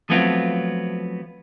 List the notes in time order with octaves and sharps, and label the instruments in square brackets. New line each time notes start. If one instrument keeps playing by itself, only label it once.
[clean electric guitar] F3 F#3 A3 B3 C4 F4